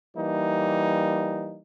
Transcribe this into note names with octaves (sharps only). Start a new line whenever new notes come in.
E3 G3 A#3 D#4